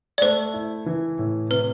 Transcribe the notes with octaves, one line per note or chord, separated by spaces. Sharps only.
D5
A3 C5
E4
E3
A2
C3 B4